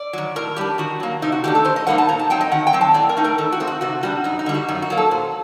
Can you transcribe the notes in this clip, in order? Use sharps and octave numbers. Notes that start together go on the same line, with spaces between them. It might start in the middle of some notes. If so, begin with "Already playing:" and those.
Already playing: D5
D#3 F#3
A2 A#4
G3 D4 G4
D#3 F#4
F#3 A#3
C3 D#4
F#4
D#3 A3 D4 G4
A4
D#3 C5
D#5
G3 A#3 D#4 F#5
A5
A#2 A#5
A5
F#3 C4 D#4 G5
D#5
D#3 F#5
G5
F#3 C4
A5
A2 D5
A#4
A3 D#4
A#4
D#3 A4
F#4
A3 C4 D#4
F#4
C3 F#4
G3 D4 F#4
F#2 D#4
D#4
D3 G3
F#4
F#2 D#4
F#4
F#3 A#3
A4
A#2 C5